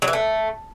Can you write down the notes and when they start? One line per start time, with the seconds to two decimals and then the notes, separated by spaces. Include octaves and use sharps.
0.02 F#3
0.08 E3
0.13 A3